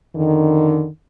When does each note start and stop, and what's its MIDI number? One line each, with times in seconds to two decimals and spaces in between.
0.15 0.86 41
0.15 0.86 50
0.15 0.86 51